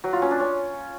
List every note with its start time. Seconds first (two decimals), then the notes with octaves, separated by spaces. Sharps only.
0.04 F#3
0.13 F4
0.22 C#4
0.31 D4
0.40 C#4